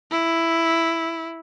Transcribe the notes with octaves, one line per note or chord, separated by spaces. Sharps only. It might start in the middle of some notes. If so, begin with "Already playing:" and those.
E4